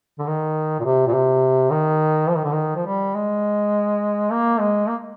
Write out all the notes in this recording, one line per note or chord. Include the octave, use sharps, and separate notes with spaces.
D3
D#3
A#2
C3
A#2
C3
D#3
F3
D#3
D3
D#3
F3
G3
G#3
A#3
G#3
A#3